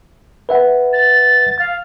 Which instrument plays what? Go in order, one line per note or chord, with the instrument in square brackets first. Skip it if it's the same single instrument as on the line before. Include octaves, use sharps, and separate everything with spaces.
[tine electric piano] B4 E5 F#5
[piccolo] A6
F5